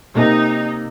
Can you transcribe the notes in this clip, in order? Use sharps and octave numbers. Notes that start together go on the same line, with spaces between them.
C3 A#3 D#4